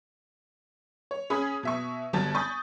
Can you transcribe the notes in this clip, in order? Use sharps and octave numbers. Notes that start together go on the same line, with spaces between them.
C#5
C#4 G#4 B5 D#6 G#6
B2 E5 C#6
G1 G3 F#4 A5 G#6 A6
G#5 B5 C#6 D#6 G6 A6